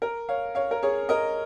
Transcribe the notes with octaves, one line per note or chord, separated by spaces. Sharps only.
A#4
C#5 F5
C#5 F5
A#4
G#4 C#5
A#4 D#5